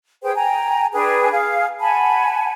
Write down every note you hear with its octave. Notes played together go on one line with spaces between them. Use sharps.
G#4 B4 C5 G5
G5 G#5 A#5
D4 G#4 B4 G5
G#4 F5
F#5 G#5 A5 B5